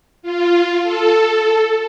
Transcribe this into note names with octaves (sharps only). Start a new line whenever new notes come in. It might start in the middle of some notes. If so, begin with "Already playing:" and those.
F4
A4